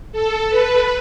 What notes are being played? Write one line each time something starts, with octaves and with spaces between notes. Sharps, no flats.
A4
B4